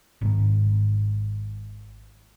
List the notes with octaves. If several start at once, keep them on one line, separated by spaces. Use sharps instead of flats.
G#1 G#2